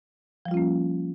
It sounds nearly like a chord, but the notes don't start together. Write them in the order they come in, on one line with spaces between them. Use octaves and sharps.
F3 G3 F4 C#4 A#3